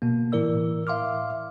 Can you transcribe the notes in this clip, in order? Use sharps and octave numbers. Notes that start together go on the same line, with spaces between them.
B2 A#3
A2 E3 E4 A#4 D5 E6
E5 F5 C6 D6 F6